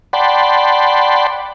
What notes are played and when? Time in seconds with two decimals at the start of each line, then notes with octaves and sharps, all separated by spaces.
0.13 D5 F#5 G5 A5 B5 C6